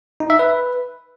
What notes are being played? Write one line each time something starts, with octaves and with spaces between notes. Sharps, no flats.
D#4
E5
B4